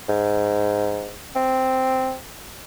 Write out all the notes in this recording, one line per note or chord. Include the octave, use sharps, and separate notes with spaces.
G#2
C4